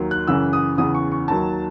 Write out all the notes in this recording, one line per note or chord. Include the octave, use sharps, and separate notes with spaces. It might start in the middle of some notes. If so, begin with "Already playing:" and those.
Already playing: D#2 D#3 F#3
F#6
F#2 C#3 E3 E6
D#6
E2 C#3 E3 D#6
C#6
C#6
D#2 D#3 F#3 A5